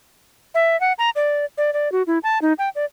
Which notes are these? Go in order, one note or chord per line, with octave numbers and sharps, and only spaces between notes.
E5
F#5
A#5
D5
D5
D5
F#4
E4
A5
D#4
G5
D5